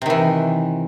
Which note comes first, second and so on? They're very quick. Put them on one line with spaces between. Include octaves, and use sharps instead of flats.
C3 D#3 E3